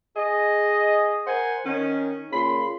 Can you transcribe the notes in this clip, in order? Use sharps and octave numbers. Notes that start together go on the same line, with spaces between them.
G#4 D#5
A#4 C5 F#5 G#5
D#3 C#4
A#2 C#3 B5 C6